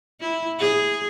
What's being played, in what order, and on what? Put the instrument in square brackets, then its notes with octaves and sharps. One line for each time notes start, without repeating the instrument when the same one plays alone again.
[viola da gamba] E4
G#4